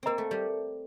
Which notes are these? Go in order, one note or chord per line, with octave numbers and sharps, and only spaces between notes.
A#3 C4 A#4 D#5 A#5
A3
G3